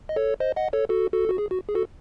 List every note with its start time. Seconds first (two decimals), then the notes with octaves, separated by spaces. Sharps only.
0.09 D#5
0.16 A4 C#5
0.40 C5 D#5
0.57 D#5 F#5
0.73 A4 C#5
0.89 F#4 A4
1.13 F#4 A4
1.29 F#4
1.38 G#4
1.51 F#4
1.69 G#4
1.75 F#4 A4